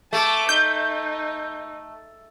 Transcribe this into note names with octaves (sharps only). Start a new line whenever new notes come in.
A3 A5 D6
D#4 G6